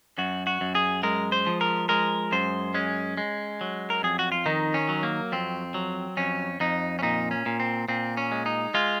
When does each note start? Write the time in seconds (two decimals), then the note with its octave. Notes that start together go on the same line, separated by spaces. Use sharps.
0.18 F#2 F#4
0.47 F#4
0.61 F#2
0.75 G#4
1.03 G#3 A#4
1.32 C5
1.47 F3
1.61 A#4
1.89 G#3 A#4
2.32 F#2 C5
2.74 G#3 C#4
3.17 G#3
3.61 F#3
3.90 A#4
4.03 F2 G#4
4.19 F#4
4.32 F4
4.46 D#3 D#4
4.74 C#4
4.89 F#3
5.03 A#3
5.32 F2 C4
5.74 F#3
6.17 F2 C#4
6.60 F2 D#4
6.99 C#4
7.03 A#2 D#4
7.31 C#4
7.46 A#2
7.60 C4
7.88 A#2 C4
8.17 C#4
8.32 G#3
8.46 D#4
8.74 G#3 F4